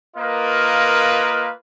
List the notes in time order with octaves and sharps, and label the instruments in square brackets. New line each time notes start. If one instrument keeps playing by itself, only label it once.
[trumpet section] A#3 F4 A#4 B4 D#5